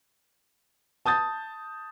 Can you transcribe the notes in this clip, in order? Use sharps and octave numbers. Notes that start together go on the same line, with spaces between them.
A5 D#6 G6 A6